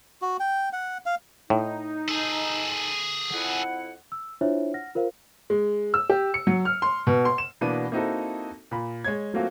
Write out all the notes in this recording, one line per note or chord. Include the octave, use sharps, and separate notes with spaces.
F#4
G5
F#5
F5
A2 D#4
G#4 A4
F2 E4 F#5
E6
D4 E4 F4 C5 C#5 E5
F#5 F6 A#6
F4 A#4 C5 F5
G#3
E6
G4
C#7
F#3
F6
C6
B2
C6
E7
B2 E3 A#3 B3 D4 D#7
A#3 C4 D#4 E4 F#4 A4
A#2 B5
G#3 C#5 G#6
F#3 A3 A#3 C4 F4 F#4